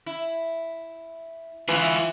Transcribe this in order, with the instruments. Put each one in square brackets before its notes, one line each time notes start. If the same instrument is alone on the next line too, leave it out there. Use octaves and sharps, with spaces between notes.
[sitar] E4
[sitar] E3 E4 [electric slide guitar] F4 B4